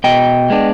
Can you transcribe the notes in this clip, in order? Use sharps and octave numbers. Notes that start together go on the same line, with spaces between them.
B2 D#5 G5
G#3 B3 D4